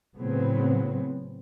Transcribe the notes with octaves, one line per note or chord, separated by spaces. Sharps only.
A2 C#3 F#3 B3 C4